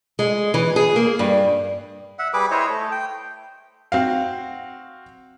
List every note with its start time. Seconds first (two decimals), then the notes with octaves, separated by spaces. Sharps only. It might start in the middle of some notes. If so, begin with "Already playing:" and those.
0.19 G#3
0.54 E3
0.76 G#4
0.96 A#3
1.19 G2
2.19 E5 F#5
2.34 G3 G#4 B4 D6
2.51 E4 C5 C#5 D#5
2.69 A3
2.92 G5
3.92 C4 F#4 F5